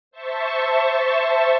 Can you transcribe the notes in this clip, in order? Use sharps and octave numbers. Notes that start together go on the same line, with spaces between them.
C5 E5 A5 C#6